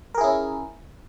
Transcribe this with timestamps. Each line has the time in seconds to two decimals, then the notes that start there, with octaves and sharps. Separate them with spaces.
0.14 A#4
0.18 G#4
0.21 E4
0.24 C#4